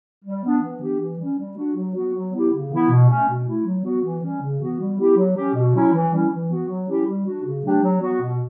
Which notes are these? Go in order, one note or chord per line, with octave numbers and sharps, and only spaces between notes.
G3
B3 D4
E3
B3 D4 G4
E3
G3 C#4
G3
D4 F#4
F#3
B3 F#4
F#3
B3 E4 G4
C#3
E3 B3 E4
B2
A3 C#4
B2
A3 E4
F#3
B3 F#4
E3
G3 C#4
C#3
E3 B3 F#4
G3
B3 E4 G4
F#3
C#4 G4
B2
F#3 C#4 E4
E3
G3 C#4 E4
E3
B3 F#4
F#3
C#4 E4 G4
G3
D4 F#4
C#3
F#3 A3 D4 G4
F#3
B3 F#4
B2